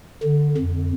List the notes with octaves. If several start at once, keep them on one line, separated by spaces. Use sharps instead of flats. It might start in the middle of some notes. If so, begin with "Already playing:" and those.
D3
F2